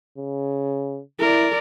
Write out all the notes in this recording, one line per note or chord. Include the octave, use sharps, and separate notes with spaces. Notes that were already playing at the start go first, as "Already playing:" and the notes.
C#3
E4 A#4 D5